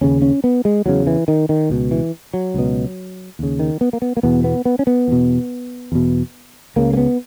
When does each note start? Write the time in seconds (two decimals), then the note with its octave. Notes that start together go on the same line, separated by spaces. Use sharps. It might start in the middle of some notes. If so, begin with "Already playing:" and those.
0.01 D#2 C#3 C#4
0.22 C#4
0.44 B3
0.65 G#3
0.86 E2 C#3 F#3
1.07 E3
1.28 D#3
1.49 D#3
1.70 C#2 B2
1.91 E3
2.34 F#3
2.54 C#2 B2
3.39 D#2 C#3
3.59 D#3
3.81 B3
3.93 A#3
4.02 B3
4.17 A#3
4.23 E2 B2 B3
4.44 B3
4.65 B3
4.79 C#4
4.87 B3
5.08 E2 B2
5.92 E2 B2
6.76 C#2 C#3 A#3
6.93 A#3
6.97 B3